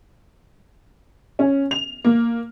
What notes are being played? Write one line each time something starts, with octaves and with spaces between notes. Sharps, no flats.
C#4
F7
A#3